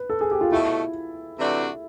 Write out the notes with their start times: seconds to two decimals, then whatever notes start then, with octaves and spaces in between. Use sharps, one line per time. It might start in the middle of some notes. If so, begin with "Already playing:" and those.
Already playing: B4
0.10 A4
0.21 G#4
0.31 G4
0.41 F4
0.52 B2 F#3 A3 E4
1.38 C3 E3 A3 D4 F#4